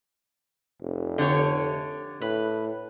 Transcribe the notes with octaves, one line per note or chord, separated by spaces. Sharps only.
F1
D3 G4 C#5
A2 B4